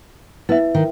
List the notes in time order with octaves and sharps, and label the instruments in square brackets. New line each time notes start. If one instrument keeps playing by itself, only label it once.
[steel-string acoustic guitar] B3 [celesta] E4 B4 E5
[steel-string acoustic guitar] D#3